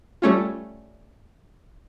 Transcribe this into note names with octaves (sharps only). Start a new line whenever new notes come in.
G3 A3 C#4 F4